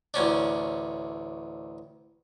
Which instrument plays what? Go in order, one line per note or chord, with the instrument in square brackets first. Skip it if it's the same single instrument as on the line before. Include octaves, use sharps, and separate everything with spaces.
[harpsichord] A1 D2 C#4 D4